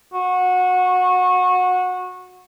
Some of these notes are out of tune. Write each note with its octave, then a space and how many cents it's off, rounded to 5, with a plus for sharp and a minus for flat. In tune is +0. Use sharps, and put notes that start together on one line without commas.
F#4 -20